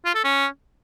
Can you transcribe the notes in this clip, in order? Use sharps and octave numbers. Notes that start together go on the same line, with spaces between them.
F4
A4
C#4